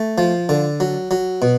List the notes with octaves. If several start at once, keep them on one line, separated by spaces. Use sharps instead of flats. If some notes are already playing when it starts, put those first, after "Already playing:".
Already playing: A3
F3
D3
F#3
F#3
B2